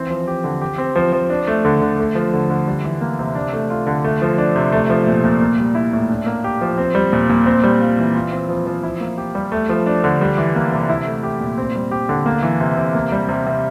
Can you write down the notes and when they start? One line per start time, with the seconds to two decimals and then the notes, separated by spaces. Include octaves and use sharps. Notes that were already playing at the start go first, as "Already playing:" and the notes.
Already playing: E3 C4
0.10 F3
0.27 G4
0.44 D3
0.61 G4
0.78 C4
0.95 F3
1.12 F3
1.30 D4
1.47 A3
1.65 D3
1.81 D3
1.99 A3
2.15 F3
2.33 D3
2.50 D3
2.67 G3
2.84 E3
3.01 A#3
3.19 C3
3.35 D4
3.53 A3
3.70 F4
3.87 D3
4.04 A3
4.22 F3
4.38 D4
4.56 C3
4.72 A3
4.90 F3
5.07 A#2
5.24 A#2
5.41 A#3
5.59 G3
5.75 E4
5.93 A2
6.09 D4
6.26 A#3
6.44 G4
6.61 F3
6.78 C4
6.95 G3
7.13 A#2
7.29 A#2
7.46 C4
7.64 G3
7.81 F4
7.99 E3
8.15 F4
8.32 C4
8.49 F3
8.67 F3
8.83 E4
9.00 A#3
9.18 G4
9.35 G3
9.52 A3
9.69 F3
9.86 D4
10.04 D3
10.21 G3
10.38 E3
10.55 A#3
10.72 C3
10.89 E4
11.06 A3
11.23 G4
11.41 A#2
11.58 C4
11.75 G3
11.91 G4
12.09 D3
12.26 A#3
12.43 E3
12.60 C3
12.77 C3
12.95 A#3
13.12 G3
13.29 C3
13.46 C3